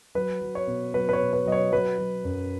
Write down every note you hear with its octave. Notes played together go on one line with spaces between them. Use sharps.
F#3 B4
F#3
C#5
B2
F#3 B4
B4
C#5
B2
B4
F#3 D#5
C#5
F#3 B4
F#3
F#2